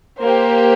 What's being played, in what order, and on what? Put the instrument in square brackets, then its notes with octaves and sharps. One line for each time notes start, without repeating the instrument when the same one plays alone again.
[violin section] A#3 G4 C5